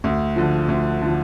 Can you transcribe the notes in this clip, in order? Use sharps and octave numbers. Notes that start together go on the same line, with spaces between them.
D2
D3 F3
D2
D3 F3